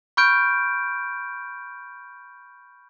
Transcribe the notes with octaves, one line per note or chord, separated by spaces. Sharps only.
B5 C#6 F6 G6 D7